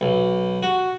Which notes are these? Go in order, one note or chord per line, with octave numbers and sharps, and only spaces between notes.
B1
F#4